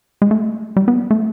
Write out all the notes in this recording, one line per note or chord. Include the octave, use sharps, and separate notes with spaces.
G#3
A3
G3
B3
A3